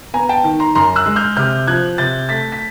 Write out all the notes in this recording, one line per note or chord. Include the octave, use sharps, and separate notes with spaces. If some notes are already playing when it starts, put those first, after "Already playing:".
B3 G#5 A#5
G5 A5
D#3
A#5 C6
F#2 A#5 C6
E6 F#6
G#3
F6 G6
C3 F6 G6
F3 F#6 G#6
C3 G6 A6
A3 A6 B6
B6